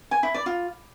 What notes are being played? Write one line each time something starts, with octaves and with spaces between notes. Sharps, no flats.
G#5
E4
D5
F4